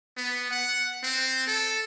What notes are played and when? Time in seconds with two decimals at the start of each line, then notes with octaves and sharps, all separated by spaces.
0.17 B3
0.51 F#5
1.03 C4
1.47 A4